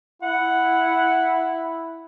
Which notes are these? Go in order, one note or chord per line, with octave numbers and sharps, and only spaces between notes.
E4 F#5